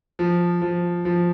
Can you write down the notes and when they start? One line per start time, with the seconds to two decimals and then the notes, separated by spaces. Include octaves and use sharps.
0.19 F3
0.62 F3
1.05 F3